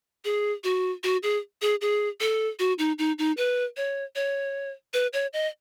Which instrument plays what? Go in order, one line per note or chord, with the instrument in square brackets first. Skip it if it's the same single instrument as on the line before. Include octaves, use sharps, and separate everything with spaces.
[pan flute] G#4
F#4
F#4
G#4
G#4
G#4
A4
F#4
D#4
D#4
D#4
B4
C#5
C#5
B4
C#5
D#5